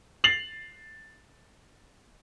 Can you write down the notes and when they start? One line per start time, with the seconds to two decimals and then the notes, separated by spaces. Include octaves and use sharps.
0.24 A6 C7 F7 F#7